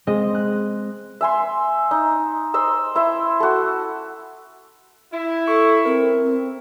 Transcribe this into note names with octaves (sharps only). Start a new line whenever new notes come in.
G#3 C4 D#5
F#6
E5 G#5 C6
D#4
C5 D#5 E6
E4 E5 C6
F#4 A4
E4
A4 C#6
C4 A#4
C4